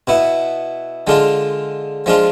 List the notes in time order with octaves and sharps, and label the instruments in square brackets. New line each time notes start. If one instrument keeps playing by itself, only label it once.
[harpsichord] B2 B3 E4
D3 G#3 D4 F4
F3 G#3 D4 F4